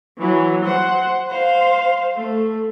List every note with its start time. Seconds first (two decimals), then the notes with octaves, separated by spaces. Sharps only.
0.18 E3 F#3
0.65 C5 F#5
1.28 C5 F5
2.16 A3